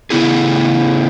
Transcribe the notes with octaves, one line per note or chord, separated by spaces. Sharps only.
C#3 B3 E4 G#4